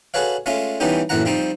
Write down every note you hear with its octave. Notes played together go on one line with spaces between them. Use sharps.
F#4 G#4 A4 B4 C#5 F5
G#3 A3 C#4 F4 A4
E3 G3 B3 C#4 D#4 G4
A#1 F#2 A2 E3 F#5 A#5
F3 G3 C4 D#4